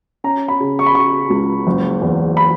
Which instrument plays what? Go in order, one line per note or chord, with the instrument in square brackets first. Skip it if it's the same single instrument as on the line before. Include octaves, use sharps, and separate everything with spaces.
[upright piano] C#4 A#5
B5
C#3
C#6
B5
C#3 C#6
C#2
F#1
E2
B5